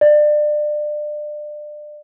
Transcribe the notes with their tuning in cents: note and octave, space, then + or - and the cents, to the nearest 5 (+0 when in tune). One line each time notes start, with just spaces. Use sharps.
D5 +30